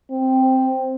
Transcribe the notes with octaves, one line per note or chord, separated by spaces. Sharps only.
C4